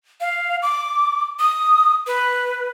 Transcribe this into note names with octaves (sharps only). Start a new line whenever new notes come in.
F5
D6
D#6
B4